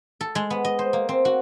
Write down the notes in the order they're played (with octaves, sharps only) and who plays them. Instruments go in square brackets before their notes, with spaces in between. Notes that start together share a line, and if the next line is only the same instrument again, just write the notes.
[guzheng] A4
G#3
B3
D#5
C5
A#3
C4
F#4